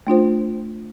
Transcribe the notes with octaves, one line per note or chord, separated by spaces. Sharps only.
A3 D4 F4 C5